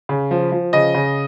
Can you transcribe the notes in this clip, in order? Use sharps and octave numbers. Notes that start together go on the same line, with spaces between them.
C#3
F3
F3
C#3 D#5
C#3